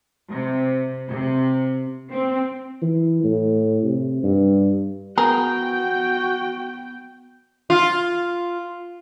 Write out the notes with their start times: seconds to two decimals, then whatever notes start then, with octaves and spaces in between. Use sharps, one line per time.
0.31 C3
1.09 C3
2.11 C4
2.82 E3
3.23 A2
3.84 C3
4.23 G2
5.18 B3 F#4 G#4 A#4 G5
7.70 F4